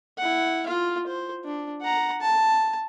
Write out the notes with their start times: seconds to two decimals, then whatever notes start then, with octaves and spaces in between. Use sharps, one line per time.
0.18 E4 F#5
0.66 F4 F5
1.07 C5
1.45 D4
1.82 F#5 A#5
2.21 A5